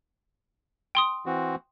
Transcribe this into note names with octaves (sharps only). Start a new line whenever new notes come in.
G5 C6 D#6
E3 C4 F#4